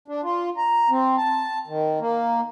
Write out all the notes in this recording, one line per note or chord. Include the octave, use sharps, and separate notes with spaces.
D4
F4
A#5
C4
A5
D#3
A#3